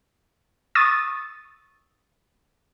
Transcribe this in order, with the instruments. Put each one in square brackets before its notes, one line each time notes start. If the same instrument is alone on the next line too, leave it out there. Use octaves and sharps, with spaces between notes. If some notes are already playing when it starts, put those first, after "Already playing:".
[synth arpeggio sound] C#6 D#6 E6 A6 D#7